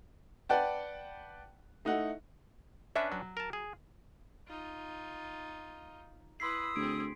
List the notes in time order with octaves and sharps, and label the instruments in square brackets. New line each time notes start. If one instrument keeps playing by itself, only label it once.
[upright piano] B4 D5 F#5 G5 A5
A3 D#4 E4 F#5
[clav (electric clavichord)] C#4 D4 B4 [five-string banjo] E5
[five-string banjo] F#3
[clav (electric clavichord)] A#4 A5
G#4
[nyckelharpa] D#4 F4
[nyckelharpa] E4 B4 [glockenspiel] C6 B6 C7 [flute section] D#6 E6
[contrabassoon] D2 [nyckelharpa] C4 G#4 [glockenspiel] D7